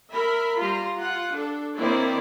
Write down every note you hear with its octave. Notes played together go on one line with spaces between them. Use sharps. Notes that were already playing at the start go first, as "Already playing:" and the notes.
A#4 E5 B5
G3 F4 A#5 C6
F4 F#5
D4 A4
D#3 A#3 C4 E4 C#5 D5